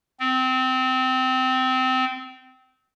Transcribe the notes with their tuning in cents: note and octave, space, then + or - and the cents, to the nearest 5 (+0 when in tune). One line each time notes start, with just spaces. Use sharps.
C4 -20